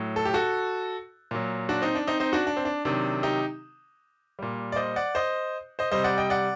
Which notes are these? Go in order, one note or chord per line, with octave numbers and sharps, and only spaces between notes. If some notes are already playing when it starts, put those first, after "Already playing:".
Already playing: A2 F#3
A4
G4
F#4 A4
A#2 F#3
D4 F#4
C4 D#4
D4
C4 D#4
C4 D#4
D4 F#4
D4
C4
D4
C3 D#3 F#3 D4
D#4 G4
A#2 G3
D5
C5 D#5
D5 F#5
C5 D#5
C5 D#5
C3 G3 C5 D#5
D5 F#5
D#5 G5
D5 F#5